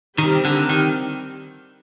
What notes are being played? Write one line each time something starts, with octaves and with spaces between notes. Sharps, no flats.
D#3 G3 C4 G4 A#4
D3
D#3